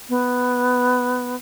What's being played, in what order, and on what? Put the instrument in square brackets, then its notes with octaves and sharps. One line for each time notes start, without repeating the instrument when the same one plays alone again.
[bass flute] B3